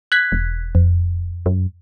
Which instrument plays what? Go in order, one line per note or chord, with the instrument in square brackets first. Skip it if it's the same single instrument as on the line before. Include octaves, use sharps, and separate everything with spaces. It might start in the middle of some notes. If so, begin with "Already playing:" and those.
[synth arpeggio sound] F#6 G#6 B6
[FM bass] E1
[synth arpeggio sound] F2
[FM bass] F#2